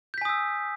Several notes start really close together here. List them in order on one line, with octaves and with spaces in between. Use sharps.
G6 B6 G#5 D#6 E6